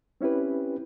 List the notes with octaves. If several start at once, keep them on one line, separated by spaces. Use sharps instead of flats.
C4 C#4 E4 G4 B4